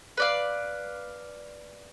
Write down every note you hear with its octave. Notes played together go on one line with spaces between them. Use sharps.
B4 D5 F5